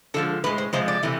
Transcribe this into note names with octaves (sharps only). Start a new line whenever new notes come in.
D3 F3 G#3 A4
A2 G#3 B4
C5
C3 F3 G#3 C5
D5
C3 E3 A3